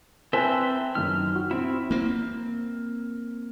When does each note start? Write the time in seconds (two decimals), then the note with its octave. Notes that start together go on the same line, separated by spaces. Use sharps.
0.33 C4 B4 C5 E5 G#5 A5
0.95 F#2 D#3 F6
1.35 F#4
1.51 C4 E4
1.91 A#3 C4